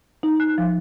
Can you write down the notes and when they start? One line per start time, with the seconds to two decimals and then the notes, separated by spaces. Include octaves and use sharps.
0.23 D#4
0.40 F#6
0.58 F3